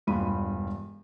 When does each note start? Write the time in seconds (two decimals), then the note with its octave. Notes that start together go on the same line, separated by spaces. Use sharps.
0.07 E1 G2 F4 B5 D#7